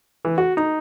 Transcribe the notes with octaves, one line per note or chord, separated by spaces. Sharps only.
E3
F#4
D#4